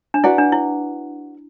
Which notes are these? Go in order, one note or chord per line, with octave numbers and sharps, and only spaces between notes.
D4
E4 F#4 B4 D5 F#5
D4
E4